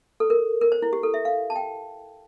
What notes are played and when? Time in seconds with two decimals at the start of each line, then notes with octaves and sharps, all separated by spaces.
0.20 A4
0.30 A#4
0.61 A#4
0.72 C5
0.82 E4
0.93 G4
1.03 A4
1.14 E5
1.25 F5
1.50 A5
1.56 G5